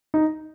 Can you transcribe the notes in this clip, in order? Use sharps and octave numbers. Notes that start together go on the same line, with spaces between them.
D#4